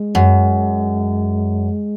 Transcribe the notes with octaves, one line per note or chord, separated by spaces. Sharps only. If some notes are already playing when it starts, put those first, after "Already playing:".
Already playing: G#3
F#2